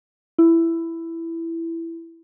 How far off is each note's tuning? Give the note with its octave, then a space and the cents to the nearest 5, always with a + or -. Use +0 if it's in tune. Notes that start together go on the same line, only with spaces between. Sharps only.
E4 +10